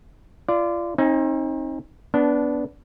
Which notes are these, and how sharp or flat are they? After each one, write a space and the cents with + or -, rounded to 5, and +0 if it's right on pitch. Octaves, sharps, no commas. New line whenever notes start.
F4 -30 D5 +0
C4 +45 D#4 +15 G#5 +0
B3 +0 D4 -15 A5 +0